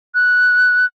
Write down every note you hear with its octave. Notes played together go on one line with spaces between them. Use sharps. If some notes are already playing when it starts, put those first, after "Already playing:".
F#6